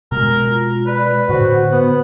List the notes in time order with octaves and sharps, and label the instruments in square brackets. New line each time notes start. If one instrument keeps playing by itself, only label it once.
[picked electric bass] B2 G#3 [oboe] A#4
[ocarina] F4
[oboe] B4 [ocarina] D5
[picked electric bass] A2 D3 [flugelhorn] F#4 [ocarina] C5
[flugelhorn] B3 [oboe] F#5